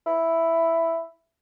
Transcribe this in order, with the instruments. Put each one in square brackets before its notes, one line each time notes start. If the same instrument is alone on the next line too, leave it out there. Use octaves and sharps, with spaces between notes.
[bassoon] E4